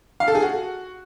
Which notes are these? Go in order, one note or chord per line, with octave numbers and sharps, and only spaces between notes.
F5
A4
G#4
F#4